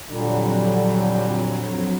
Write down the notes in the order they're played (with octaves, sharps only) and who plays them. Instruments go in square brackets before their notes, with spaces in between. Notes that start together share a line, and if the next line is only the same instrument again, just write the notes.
[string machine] F2 F#3 [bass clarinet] A#2 [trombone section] D3 G3 [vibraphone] D4 A#5 B5